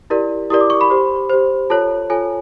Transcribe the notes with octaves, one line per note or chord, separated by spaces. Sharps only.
E4 G4 A#4 D5
E4 G4 A#4 D5 D#6
D6
C#6
B5
G4 C5
G4 C5
F4 A4 C#5 A5
F4 A4 C#5 G#5